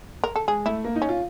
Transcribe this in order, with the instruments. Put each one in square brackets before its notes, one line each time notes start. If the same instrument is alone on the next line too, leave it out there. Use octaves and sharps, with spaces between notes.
[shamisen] A#4
A4
[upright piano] G#3 [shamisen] G#4
[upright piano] A3 [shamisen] E4
[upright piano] A#3
D#4
[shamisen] C#4
[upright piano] F4